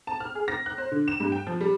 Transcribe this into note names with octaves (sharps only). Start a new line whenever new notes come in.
A5
F6
G#4
A#6
F#6
C5
D3
E7
G2
G5
F3
G3